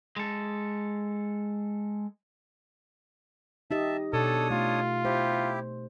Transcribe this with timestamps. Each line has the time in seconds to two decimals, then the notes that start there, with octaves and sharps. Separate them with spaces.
0.16 G#3 A4
3.71 D#4 G4 D#5 E5 A5
4.13 B2 D4 A4 C#5 D#6
4.51 A3 F4
5.05 E4 G4 C5